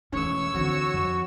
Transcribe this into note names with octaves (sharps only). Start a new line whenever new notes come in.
E1 E3 A3 C#4 C#5 E6
D2 D3 E3 C4 F#4
F2